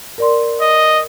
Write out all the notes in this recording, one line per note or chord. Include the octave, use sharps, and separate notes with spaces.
A#4 D5 C6
D#5